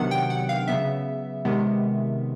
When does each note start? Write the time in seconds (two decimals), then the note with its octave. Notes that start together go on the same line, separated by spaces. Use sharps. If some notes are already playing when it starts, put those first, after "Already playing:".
Already playing: C3 D#3 F#3 B3 D4 F#5
0.11 G5
0.30 F#5
0.49 F5
0.67 C#3 F#3 B3 E5
1.45 C3 D#3 G#3 B3